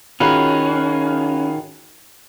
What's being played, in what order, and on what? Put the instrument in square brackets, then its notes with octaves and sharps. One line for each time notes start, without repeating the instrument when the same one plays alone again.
[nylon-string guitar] D#3 [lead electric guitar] C#4 [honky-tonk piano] F4 F#4 G#4 [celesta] B5 F#7